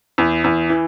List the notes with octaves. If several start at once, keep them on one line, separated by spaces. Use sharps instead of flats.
E2
E2
E3